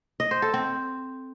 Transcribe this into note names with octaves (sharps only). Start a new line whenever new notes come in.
D#5
C5
A4
C4